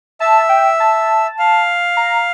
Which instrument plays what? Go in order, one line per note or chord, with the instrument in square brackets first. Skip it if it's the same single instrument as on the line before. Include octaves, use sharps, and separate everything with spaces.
[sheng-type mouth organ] E5 [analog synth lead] A5
[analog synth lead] G5
A5
[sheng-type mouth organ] F5
[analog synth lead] A#5